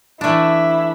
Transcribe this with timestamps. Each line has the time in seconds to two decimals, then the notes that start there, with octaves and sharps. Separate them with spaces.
0.21 E3 A3 D4 E4